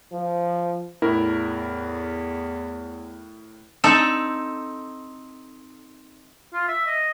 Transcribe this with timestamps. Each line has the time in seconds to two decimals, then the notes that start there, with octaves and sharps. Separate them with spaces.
0.12 F3
1.02 E2 A2 E4 A#4
3.84 C4 D#4 A4
6.53 F4
6.68 E5
6.86 D#5